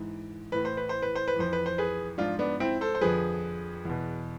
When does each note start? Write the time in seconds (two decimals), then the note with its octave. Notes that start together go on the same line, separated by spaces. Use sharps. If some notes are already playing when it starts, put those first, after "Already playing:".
Already playing: G#2 E3
0.52 A2 E3 B4
0.65 C5
0.77 B4
0.89 C5
1.02 B4
1.15 C5
1.28 B4
1.36 F2 E3 C5
1.53 B4
1.66 C5
1.78 G#4 B4
2.18 G#2 F3 D4 F4
2.39 B3 D4
2.60 C4 E4
2.81 A4 C5
2.95 C5
3.01 F2 D3 F3 G#4 B4
3.85 E2 B2